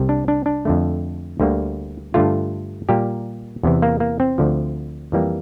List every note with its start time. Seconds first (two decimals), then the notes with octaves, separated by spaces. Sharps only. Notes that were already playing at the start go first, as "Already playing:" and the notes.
Already playing: C2 C3 G3
0.09 D4
0.28 D4
0.46 D4
0.65 F2 D3 A3
1.40 D2 D3 G3 A#3
2.14 G2 D3 A3 F4
2.89 A#2 G3 A#3 G4
3.63 E2 C3 E3
3.82 A#3
4.00 A#3
4.20 C4
4.38 D2 D3 F3
5.12 F2 E3 G3 A#3